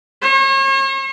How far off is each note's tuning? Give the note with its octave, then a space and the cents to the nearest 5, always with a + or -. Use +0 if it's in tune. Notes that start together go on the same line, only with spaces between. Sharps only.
C#5 -40